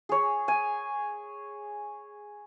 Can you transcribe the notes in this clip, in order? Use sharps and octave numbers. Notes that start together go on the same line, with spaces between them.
G#4 C#5
G#5